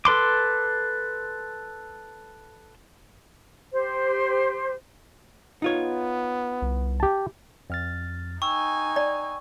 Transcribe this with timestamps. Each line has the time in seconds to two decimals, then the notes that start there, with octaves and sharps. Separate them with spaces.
0.05 A4 B4 C6 D6
3.72 G4 C5
5.62 B3 D#4 F4 C#5
6.62 C2
7.00 G4 A5
7.70 F2 F6 A6
8.42 D#4 G5 G#5 C#6 E6
8.96 D5